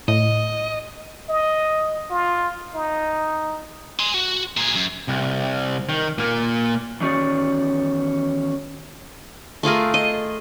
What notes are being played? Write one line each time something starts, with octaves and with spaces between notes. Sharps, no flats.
A2 D#5
D#5
F4
D#4
G#5 C6
F#4
A#2 G#4
F#2
C2
D#3
A#2 A#3
E2 D#3 C#4 F#4 D5
A3 F4 G#4 A#4
D#5